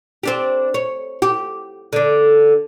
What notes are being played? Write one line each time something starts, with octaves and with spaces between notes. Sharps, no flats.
C4 D4 G4
C#5
G4
D3 D4